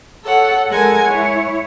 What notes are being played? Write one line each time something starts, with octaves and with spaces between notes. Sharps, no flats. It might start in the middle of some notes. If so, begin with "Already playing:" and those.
A4 C#5 F#5
G#3 A4 A#4 F#5 G#5 G#6
E4 C#5